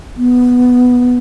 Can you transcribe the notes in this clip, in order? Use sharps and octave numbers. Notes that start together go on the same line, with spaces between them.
B3